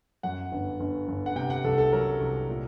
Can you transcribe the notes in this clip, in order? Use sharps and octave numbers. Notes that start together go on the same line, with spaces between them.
F#2 F#5
G1
G1
G1
F#5
C3 G5
F#5
C2 A4
A4
F#3 A#4
C2
A#2